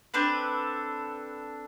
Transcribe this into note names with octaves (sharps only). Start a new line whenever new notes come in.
C4 D4 A4 B4